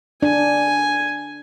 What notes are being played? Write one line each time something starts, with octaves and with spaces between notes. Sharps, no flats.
D4 G#5